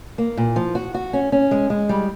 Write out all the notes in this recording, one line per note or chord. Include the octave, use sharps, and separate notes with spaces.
A#3
A#2
F3
F#4
F#4
C#4
C#4
G#3
G#3
G3